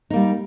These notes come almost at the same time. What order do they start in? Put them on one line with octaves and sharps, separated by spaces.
D#4 A#3 G3